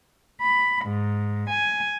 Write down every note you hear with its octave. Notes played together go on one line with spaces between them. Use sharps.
B5
G#2
G#5